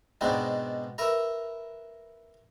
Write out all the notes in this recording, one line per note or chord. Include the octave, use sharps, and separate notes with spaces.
G#2 B2 B3 C4 D4 D#4
A#4 B4 E5 A#5